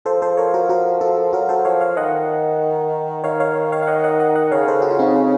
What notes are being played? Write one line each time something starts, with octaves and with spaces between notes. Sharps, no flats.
F3 A4 C5
A4 C5
A#4 C#5
F#4 A#4
F#4 A#4
F4 A4
F#3 F#4 A#4
A4 C5
F3 C#5 F5
C#5 F5
D#3 D#5 F#5
D#3 C#5 F5
C#5 F5
C#5 F5
F5
D#5 F#5
D#5 F#5
D#5 F#5
D#5 F#5
C#3 C#5 F5
A4 C5
F#4
F4
C4 D#4